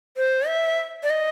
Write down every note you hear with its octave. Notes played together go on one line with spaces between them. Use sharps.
C5
E5
D5
D#5